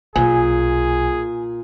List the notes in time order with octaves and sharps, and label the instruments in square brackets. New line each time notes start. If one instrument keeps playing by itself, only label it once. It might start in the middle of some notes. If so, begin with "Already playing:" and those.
[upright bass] B1 [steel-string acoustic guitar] A#2 [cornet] G#4 [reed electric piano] G#5